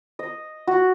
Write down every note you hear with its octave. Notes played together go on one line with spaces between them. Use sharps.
D#5
F#4